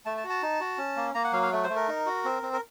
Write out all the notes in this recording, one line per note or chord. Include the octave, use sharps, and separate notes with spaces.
A3 A5
A5
F#4
A5
D#4
F#4
C#4
A#3
A#3 A#5
F#5
F#3 F5
F5
A3
C5
A3
A#4
D#4
F#4
C4
C4
A#4